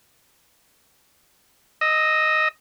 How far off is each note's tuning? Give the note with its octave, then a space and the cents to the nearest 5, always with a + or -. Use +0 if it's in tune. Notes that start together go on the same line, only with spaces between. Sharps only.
D#5 +0 E6 -25